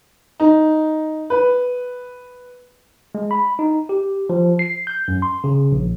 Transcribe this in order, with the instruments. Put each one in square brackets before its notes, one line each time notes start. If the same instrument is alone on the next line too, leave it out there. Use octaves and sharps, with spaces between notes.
[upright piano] D#4
B4
[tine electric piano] G#3
B5
D#4
G4
F3
C7
G6
F#2
C6
C#3
A#1